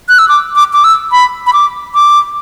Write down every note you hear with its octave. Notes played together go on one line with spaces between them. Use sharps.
F#6
E6
D6
D6
D6
E6
B5
B5
D6
D6